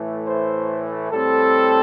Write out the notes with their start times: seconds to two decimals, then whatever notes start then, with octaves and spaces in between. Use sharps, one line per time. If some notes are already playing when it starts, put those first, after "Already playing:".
Already playing: A2 E3 A3
0.28 C5
1.11 A2 G3 C4 A4